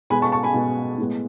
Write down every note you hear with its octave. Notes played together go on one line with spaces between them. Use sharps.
B2 G#3 B3 G#5 B5
A5 C#6
A5 C#6
G#5 B5
B2 G#3 B3
A2 G#3 B3